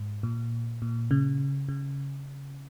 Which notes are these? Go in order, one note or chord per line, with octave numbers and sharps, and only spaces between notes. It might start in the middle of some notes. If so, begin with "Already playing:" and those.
Already playing: G#2
A#2
A#2
C#3
C#3